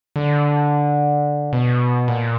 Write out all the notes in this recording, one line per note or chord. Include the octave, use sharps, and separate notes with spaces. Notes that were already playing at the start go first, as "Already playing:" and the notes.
D3
B2
A#2